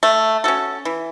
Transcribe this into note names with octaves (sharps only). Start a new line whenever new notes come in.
A3
C#4 F#4 A4
E3